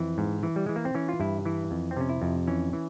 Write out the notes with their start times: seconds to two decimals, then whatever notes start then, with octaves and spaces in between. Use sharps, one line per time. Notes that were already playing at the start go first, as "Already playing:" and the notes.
Already playing: F2 E3 C4
0.18 G#2
0.43 E3
0.56 G3
0.66 E3 G#3
0.76 A#3
0.85 C4
0.95 E3 C#4
1.09 F4
1.20 G2 E4
1.45 E3 E4
1.71 F2
1.91 C4
1.97 C3 C#4
2.09 E4
2.22 F2
2.47 E3 C#4
2.73 E3